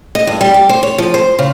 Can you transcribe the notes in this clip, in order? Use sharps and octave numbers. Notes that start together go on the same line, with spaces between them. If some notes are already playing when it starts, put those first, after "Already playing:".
D#5
G2
G3
G4
C5
C#5
F3
C5
C#3